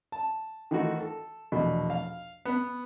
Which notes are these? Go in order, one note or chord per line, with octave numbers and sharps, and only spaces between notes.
A5
D#3 E3 A3 F4 F#4 A4
A4
A#1 E2 B2 A3
F5
B3